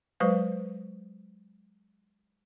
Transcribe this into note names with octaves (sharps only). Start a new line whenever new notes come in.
F#3 G#3 B4 C5 F5